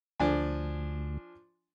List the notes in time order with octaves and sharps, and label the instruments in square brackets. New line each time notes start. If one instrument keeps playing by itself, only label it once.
[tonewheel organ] D2 [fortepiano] F3 D4 G#5